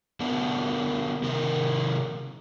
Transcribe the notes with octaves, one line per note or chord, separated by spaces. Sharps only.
D3 B3 D4 A#4
C3 D#3 A#4